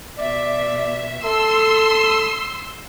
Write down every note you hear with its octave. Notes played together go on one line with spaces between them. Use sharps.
B2 D5 E5
A4 C6 E6